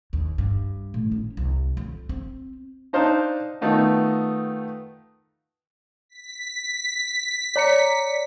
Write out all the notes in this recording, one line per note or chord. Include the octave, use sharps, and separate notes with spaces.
D#2
G2
A2
C#4
C2
F2
C4
D4 D#4 C5 F5 A5 A#5
D#3 A3 B3 D#4 F4
B6
C#5 D5 A#5 C#7